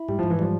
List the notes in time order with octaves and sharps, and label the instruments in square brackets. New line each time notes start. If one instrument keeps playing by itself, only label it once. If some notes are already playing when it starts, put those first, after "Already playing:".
Already playing: [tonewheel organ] E4
[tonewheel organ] G#2 [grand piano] G3
[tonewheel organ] G#2 [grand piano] F3
[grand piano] E3
[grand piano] F3 [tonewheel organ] G3